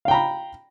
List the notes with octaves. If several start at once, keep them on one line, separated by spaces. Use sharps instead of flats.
F5 G5 A#5 B5